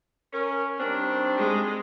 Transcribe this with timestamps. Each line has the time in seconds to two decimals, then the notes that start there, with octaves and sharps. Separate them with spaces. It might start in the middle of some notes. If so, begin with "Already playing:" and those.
0.33 C#4 A#4
0.79 D#3 G3 C4 D4
1.38 G#3